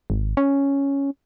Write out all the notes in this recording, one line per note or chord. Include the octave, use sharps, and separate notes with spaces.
G#1
C#4